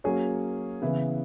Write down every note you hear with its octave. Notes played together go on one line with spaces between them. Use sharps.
F#3 A#3 C#4 G#4 C#5
C#3 E3 B3 E4 B4